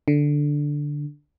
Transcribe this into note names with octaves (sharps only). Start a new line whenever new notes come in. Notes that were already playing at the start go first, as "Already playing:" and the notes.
D3